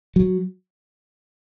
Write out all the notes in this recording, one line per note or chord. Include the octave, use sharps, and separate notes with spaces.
F#3